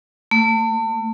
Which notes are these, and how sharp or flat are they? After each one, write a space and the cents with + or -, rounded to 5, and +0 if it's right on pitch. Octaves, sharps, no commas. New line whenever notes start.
A3 +35